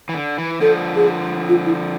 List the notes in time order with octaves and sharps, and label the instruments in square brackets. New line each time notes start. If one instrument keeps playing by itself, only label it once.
[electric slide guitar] E3
D3
E3
[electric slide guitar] D3 F3 [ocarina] A4
[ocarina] G#4
F4
E4